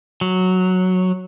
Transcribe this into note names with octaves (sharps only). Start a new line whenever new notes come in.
F#3